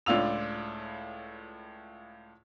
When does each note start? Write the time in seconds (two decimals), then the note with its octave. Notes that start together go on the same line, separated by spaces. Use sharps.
0.06 C#2 A2 D4 F4 E6 F7